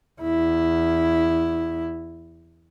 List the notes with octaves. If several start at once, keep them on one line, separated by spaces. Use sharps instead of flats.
E2 E4